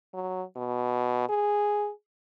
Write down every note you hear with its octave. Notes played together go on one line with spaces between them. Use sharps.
F#3
B2
G#4